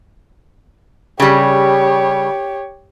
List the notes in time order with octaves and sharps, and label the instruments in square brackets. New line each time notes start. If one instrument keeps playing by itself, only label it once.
[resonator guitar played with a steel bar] C#3 G3 [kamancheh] G4 C#5